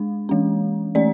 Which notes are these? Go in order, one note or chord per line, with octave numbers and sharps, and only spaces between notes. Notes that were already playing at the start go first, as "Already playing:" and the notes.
Already playing: G#3 D4
E3 G#3 C#4
E3 A3 C#4 D5